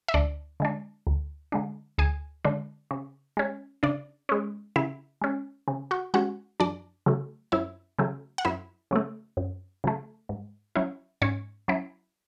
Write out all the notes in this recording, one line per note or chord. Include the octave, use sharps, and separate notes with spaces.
E5
D2 D4 D5
D3 G#3 D4
D2
D3 G#3 D4
D2 G#4 G#5
D3 G#3 D4
C#3
G#3 C#4
C#3 D4 D5
G#3 C#4
C#3 E4 E5
G#3 C#4
C#3
F#4 F#5
G#3 C#4 F#4 F#5
F#2 D4 D5
C#3 F#3 A3
F#2 E4 E5
C#3 F#3 A3
F#5
F#2 E4 E5
C#3 F#3 A3
F#2
C#3 F#3 A3
G#2
F#3 C#4 E4
G#2 C#4 C#5
F#3 C#4 E4